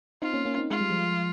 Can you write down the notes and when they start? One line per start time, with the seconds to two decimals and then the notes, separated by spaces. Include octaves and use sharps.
0.22 C4 D#4 F4
0.33 A#3 C#4
0.45 A#3 C#4
0.58 C4 D#4
0.70 G#3 F4
0.80 G3
0.90 F3 G#3